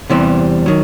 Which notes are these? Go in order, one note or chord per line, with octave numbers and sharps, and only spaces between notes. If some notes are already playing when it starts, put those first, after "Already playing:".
E2 C3 E3 G3 C4
D#3 F#3